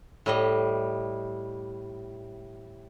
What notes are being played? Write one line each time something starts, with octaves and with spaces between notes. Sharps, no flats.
A2 G3 D#5